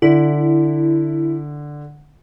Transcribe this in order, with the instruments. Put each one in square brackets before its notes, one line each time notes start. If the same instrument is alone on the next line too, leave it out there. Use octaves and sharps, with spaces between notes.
[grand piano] D3 [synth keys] E4